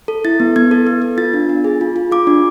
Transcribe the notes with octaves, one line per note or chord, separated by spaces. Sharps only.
A4
E4 A6
B3
B3 G#6
A4
B3
B3
F4 A6
D4
D4
G#4
F4
F4
F4 D6
D4